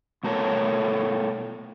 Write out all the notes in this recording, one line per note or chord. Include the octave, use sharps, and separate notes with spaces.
B2 A3 A4 A#4 C#5